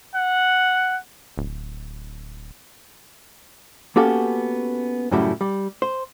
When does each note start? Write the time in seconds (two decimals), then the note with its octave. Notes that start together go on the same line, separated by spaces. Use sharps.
0.15 F#5
1.38 D1
3.96 A#3 B3 C#4 F#4 G4 A4
5.11 F#2 A2 C#3 F#3 G3 E4
5.41 G3
5.82 C5